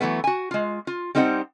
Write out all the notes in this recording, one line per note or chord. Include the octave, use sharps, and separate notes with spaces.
E3 F#3 A3 B3
F#4 G#5
G#3 F4
F4
G3 C4 D#4 C5 D#5 F#5